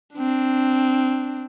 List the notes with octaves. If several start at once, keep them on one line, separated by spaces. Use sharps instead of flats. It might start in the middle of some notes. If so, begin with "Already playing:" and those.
C4 D4